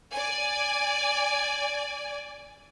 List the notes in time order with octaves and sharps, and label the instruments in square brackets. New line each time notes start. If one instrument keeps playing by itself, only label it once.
[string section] D5 G#5